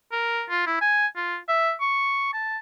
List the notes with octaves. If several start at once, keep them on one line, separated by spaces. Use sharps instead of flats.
A#4
F4
E4
G#5
F4
E5
C#6
A5